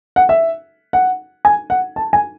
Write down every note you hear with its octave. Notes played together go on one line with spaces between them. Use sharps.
F#5
E5
F#5
G#5
F#5
A5
G#5